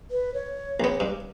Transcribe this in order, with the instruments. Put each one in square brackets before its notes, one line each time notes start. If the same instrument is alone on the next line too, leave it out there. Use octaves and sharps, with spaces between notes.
[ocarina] B4
C#5
[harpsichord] A#1 B3
G2